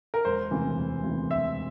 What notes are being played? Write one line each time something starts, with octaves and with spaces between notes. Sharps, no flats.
A#4
E1 C5
D2 C3 E3
E1
D2 C3 E3
E1 E5